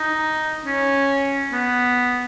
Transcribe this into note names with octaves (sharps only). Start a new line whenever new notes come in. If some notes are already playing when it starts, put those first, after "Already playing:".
Already playing: D#4
C#4
B3